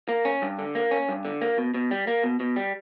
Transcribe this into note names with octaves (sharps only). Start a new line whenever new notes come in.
A#3
C#4
G2
D3
A#3
C#4
G2
D3
A#3
B2
B2
G3
A#3
B2
B2
G3